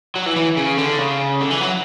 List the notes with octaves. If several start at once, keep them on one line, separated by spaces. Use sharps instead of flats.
F#3
E3
E3
C#3
D3
C#3
D3
E3
F#3